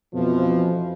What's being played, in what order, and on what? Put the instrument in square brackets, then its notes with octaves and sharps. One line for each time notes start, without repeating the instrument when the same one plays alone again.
[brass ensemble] F2 B2 E3 F3